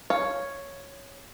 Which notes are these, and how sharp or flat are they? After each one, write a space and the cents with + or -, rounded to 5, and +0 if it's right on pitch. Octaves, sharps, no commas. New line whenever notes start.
C#5 +0 F5 +0